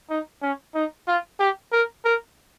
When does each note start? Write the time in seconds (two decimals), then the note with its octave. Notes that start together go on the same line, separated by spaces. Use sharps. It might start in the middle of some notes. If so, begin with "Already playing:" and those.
0.10 D#4
0.42 C#4
0.75 D#4
1.07 F4
1.40 G4
1.72 A#4
2.05 A#4